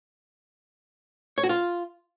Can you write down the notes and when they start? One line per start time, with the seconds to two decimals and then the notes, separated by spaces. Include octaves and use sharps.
1.38 C#5
1.44 F#4
1.49 F4